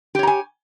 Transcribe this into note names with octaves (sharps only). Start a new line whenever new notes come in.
G4 C#5 G#5 A#5